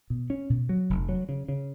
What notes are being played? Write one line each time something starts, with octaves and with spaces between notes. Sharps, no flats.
B2
C#4
B2
F#3
F1
F#3
C#3
C#3